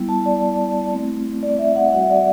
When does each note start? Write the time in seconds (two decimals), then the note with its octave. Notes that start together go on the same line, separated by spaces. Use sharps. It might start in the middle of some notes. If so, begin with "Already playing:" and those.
Already playing: G3 B3 E4
0.09 A5
0.26 D5
0.92 A3 C4 E4
1.43 D5
1.59 E5
1.76 F#5
1.92 G3 C4 F#4 F#5
2.03 E5
2.10 D5